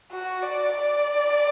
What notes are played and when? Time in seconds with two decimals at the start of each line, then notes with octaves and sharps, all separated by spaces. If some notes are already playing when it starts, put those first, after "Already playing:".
0.12 F#4
0.43 D5
0.73 D5